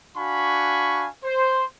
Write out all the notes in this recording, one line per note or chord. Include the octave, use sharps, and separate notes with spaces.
D4 F#4 F5 G#5 B5 C#6
C5